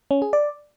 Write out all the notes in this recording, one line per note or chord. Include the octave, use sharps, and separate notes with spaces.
C#4
G#4
D5